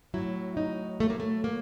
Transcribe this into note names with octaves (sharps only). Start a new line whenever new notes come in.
A2 F#3 E4
D#4
A3
A#3
A3
A#3